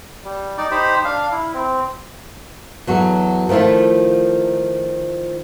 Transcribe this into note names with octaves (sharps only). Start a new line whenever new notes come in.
G3
D#4 D5
D#4 G4 C5 B5
D4 F5
E4
C4
E2 F#3 F#4 A4
D#3 F3 A3 E4 F4